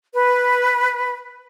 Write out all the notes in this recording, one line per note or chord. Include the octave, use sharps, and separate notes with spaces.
B4